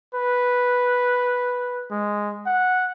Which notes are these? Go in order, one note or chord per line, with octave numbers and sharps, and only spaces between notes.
B4
G#3
F#5